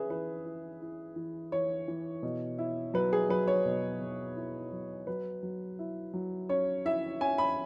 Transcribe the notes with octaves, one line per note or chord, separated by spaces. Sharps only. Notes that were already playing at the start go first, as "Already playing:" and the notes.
Already playing: C#4 G#4 B4 E5
E3 B4
E4
E4
E3
E3 C#5
E3
B2
E4
F#3 B4
G#4
F#3 B4
C#5
B2
B2
E4
F#3
F#3 B4
F#3
E4
F#3
C#4 C#5
E4 E5
C#4 G#5
B5